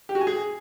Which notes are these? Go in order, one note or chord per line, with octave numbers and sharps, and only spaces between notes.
G4
F#4
G#5
G#4